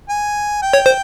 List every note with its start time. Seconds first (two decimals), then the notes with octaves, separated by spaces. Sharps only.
0.09 G#5
0.62 G5
0.73 C#5
0.86 C5